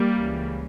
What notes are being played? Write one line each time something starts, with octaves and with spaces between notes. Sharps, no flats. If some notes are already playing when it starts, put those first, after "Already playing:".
Already playing: G3 A#3
C#2 C#3 E3